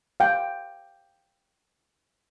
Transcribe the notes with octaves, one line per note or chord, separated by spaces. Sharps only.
F5 G5